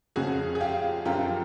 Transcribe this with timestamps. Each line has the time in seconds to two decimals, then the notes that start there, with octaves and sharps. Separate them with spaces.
0.16 F2 C#3 F3 F#4 G#4
0.55 G#4
0.61 F4 G4
1.05 F#2 D3 F3 F4 G4